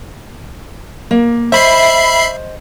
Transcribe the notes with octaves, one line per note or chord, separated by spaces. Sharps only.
A#3
C5 D#5 E5 B5 C7